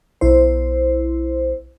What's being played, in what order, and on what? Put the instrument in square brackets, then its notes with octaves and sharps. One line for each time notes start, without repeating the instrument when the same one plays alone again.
[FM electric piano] B1 E4 C5